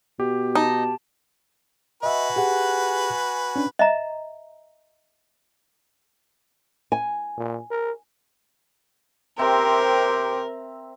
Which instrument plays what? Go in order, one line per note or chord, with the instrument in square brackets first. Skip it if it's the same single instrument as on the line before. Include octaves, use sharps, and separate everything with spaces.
[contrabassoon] B2 [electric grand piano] G4
[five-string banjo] D#4 [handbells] A5
[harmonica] F#4 B4 G#5 [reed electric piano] D#5 E5
[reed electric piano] G4 G#4 F#5
C#4 D4
[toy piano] D#5 E5 A#5
[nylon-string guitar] G#5
[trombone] A#2
A#4
[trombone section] C3 G4 C5 [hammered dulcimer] C4 E5 A#5 [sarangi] A#4